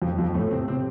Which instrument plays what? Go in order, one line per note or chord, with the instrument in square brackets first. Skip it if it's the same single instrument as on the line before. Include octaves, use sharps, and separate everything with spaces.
[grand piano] F2 F3
F2 F3
A2 A3
C3 C4
C3 C4